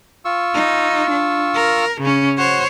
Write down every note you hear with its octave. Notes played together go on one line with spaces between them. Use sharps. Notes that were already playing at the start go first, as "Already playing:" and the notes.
F4 C#6 E6
D#4
D4
A#4
C#3 C#4
F#4 C5 C#5